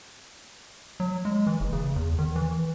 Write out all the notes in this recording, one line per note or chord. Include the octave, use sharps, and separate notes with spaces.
F#3
G#3
E3
F#1
C#3
E2
D#3
E3